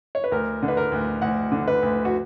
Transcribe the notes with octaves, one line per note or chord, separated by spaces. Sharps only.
C#5
B4
D2 A#4
D3
B4
A#4
D2
D2 F#5
D3
B4
D2
F#4